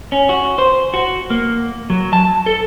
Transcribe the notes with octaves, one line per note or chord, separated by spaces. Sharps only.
C#4
F#4
C5
F#4
A#3
F#3
A5
A4